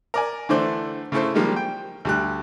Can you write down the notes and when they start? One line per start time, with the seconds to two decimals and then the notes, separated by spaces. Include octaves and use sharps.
0.14 A#4 D5 G#5
0.49 D3 E3 A3 D4 C5 D5
1.12 C#3 A3 E4 A4 C5
1.35 D#3 F3 G3 G#3 A#3
1.56 G5
2.05 D2 G3 F#6